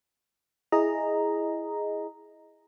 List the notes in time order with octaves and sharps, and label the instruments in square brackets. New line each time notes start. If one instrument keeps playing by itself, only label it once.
[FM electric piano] E4 G#4 D#5 A#5